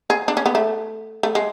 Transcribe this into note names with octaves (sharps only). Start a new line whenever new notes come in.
G#4
D4
C#4
B3
A3
A3
G#3